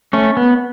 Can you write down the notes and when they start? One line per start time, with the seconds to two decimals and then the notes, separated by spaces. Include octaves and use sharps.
0.13 A3 C#4
0.37 B3